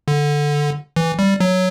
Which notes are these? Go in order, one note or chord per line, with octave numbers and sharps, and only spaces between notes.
D3
E3
G3
F#3